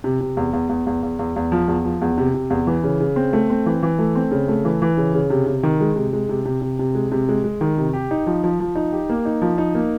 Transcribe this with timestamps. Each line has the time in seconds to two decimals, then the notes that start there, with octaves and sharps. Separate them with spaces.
0.04 C3
0.21 C3
0.37 E2
0.53 E2
0.69 E2
0.87 E2
1.03 E2
1.19 E2
1.36 E2
1.52 F3
1.68 E2
1.85 F3
2.02 E2
2.18 C3
2.34 C3
2.50 E2
2.67 E3
2.84 C#3
3.00 C#3
3.16 C4
3.33 A3
3.50 C4
3.66 E3
3.83 E3
3.99 A3
4.15 C4
4.31 C#3
4.48 A3
4.65 E3
4.82 E3
4.97 C#3
5.14 C#3
5.30 C3
5.47 C3
5.63 D#3
5.80 G#3
5.96 C3
6.13 G#3
6.29 C3
6.45 C3
6.62 C3
6.79 C3
6.95 G#3
7.12 C3
7.29 G#3
7.44 G#3
7.61 D#3
7.78 C3
7.93 G4
8.11 D#4
8.27 F3
8.44 F3
8.60 F3
8.75 D#4
8.92 G4
9.09 A#3
9.25 D#4
9.42 F3
9.58 D#4
9.75 A#3